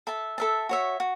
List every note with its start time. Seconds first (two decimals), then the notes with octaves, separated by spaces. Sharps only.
0.07 A4 E5 A5
0.38 A4 E5 A5
0.69 F#4 C#5 E5
1.00 F#4